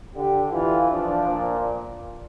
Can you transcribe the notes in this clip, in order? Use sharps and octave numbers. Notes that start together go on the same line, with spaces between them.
D3 G4
E3 F4
F3 D4
A#2